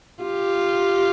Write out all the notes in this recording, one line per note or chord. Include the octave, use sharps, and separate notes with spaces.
F4 G4